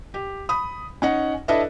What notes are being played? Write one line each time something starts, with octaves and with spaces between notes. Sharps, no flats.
G4
B5 D#6
C#4 D#4 F#5
D4 E4 A4 B4 D#5 E5